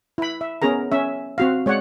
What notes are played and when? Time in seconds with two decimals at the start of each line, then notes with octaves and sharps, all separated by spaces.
0.18 E4 B5
0.41 E5
0.62 B3 C#4 G#4 A#4 A#5
0.92 C#4 E5
1.38 C4 F#4 F5
1.66 G#3 C#5 D5 F#5